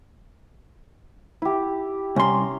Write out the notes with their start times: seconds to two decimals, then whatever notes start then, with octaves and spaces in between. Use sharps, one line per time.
1.42 E4 G4
2.16 C2 C#4 A#5 C6